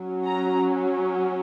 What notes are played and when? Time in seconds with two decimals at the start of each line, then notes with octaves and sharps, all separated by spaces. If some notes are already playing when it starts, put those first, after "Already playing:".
Already playing: F#3 C#4
0.25 A#5